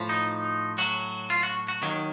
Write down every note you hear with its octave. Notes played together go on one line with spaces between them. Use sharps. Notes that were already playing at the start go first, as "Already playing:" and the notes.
Already playing: A2 F3
D#4
A2 F#3 F#4
F4
F#4
F#4
D#2 D#3 F#3